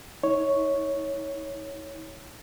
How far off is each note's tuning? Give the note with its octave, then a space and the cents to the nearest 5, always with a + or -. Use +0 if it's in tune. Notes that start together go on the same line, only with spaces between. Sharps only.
E4 -45 C#5 +0